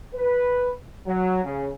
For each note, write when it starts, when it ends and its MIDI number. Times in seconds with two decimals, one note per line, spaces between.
0.15 0.73 71
1.07 1.42 54
1.45 1.70 49